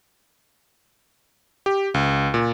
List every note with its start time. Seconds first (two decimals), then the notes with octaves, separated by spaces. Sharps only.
1.66 G4
1.94 C#2
2.34 A#2